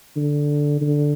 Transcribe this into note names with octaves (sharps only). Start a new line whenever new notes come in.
D3
D3